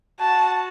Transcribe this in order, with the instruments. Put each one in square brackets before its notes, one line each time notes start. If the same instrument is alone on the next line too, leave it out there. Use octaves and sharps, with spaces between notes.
[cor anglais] F#4 [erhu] A5